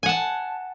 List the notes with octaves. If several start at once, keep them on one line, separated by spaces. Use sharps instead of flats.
F#5 G#5 A5